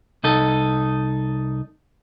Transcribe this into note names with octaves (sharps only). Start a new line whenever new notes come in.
C2 D#4 A4